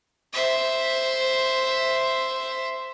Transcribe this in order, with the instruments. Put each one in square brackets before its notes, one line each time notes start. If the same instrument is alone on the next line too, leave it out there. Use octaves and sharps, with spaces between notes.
[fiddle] C5 E5